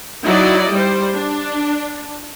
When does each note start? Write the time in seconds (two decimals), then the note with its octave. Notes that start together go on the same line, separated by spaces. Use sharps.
0.23 F#3 D#4 E4 D5 D#5
0.72 G3 C5
1.13 D4